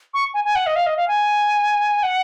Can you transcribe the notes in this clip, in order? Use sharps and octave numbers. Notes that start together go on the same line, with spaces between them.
C#6
G#5
G#5
F#5
D#5
F5
D#5
F5
G#5
F#5